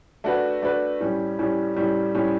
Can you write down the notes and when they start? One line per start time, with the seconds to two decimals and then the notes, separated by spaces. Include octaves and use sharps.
0.24 A3 D4 F#4 B4
0.62 A3 D4 F#4 B4
1.00 A2 G3 C#4
1.39 A2 G3 C#4
1.76 A2 G3 C#4
2.15 A2 G3 C#4